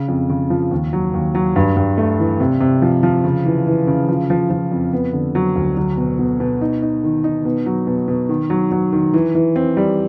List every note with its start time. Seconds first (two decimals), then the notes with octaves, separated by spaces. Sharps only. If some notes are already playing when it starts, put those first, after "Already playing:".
Already playing: C#3
0.08 F2
0.29 C#3
0.50 F3
0.71 D#2
0.93 F#3
1.14 D#2
1.35 F#3
1.56 G2
1.77 G2
1.98 A3
2.19 E3
2.40 C3
2.61 C3
2.82 F3
3.03 F3
3.24 C#3
3.45 E3
3.67 E3
3.87 C#3
4.08 F3
4.30 F3
4.50 F3
4.71 F2
4.93 B3
5.13 D3
5.35 F#3
5.56 D2
5.77 F#3
5.97 B2
6.19 B2
6.40 B2
6.61 D#4
6.82 D#4
7.04 D#3
7.24 D#4
7.45 B2
7.66 F#3
7.87 B2
8.08 B2
8.29 D#3
8.50 F#3
8.72 F#3
8.93 D#3
9.14 E3
9.35 E3
9.56 C4
9.77 G3